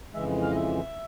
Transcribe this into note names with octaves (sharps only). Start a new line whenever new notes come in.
F2 C#3 E3 G#3 E5
F5
D#5
E5